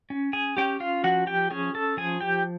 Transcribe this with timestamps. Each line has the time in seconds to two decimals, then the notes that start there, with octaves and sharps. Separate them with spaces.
0.10 C#4
0.33 G#4 G#5
0.57 C#4 G4 G5
0.80 F4 F5
1.04 F3 F#4 F#5
1.27 G4 G5
1.51 C#4 G#4 G#5
1.75 A4 A5
1.97 F3 G#4 G#5
2.21 G4 G5